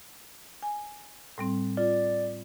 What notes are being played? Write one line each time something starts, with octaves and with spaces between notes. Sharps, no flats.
G#5
A2 G3 C4
F4 D5